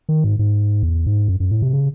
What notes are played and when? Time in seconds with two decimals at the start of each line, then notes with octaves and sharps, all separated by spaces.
0.09 D#3
0.24 G#2
0.39 G#2
0.83 E2
1.06 G#2
1.28 F#2
1.40 F#2
1.51 A2
1.62 C3
1.73 C#3